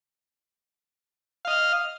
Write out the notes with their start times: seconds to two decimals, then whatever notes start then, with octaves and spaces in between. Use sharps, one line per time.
1.45 F5
1.48 D#5
1.50 F6